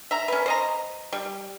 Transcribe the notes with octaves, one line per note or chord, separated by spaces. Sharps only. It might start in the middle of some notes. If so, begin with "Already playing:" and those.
E5 A#5
C#4 B4
C5 D#5 A#5
G3